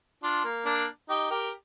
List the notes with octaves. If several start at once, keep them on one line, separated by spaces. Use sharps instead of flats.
D4 F4
A#3
A#3 D4
D#4 G4
G4 A#4